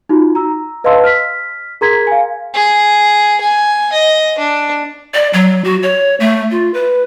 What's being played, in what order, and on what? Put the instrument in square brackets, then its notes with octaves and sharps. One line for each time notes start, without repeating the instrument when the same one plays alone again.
[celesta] D#4 F4 F#4
A#5 E6
B4 D#5 F5 A5 C6 E6
F6 B6
G#4 A#4 A#5 C6 G#6 B6
F5 G#5
[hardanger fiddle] G#4
G#5
D#5
D4
[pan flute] D5
F#3
F#4
C#5
A3
F4
B4